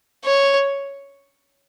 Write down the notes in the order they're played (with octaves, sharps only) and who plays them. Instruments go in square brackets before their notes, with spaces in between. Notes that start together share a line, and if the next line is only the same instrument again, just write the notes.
[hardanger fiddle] C#5